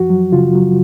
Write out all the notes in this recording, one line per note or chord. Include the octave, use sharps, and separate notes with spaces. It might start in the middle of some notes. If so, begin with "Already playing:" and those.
Already playing: F#2 F3 F#4
F#3
C#3 F4
F#3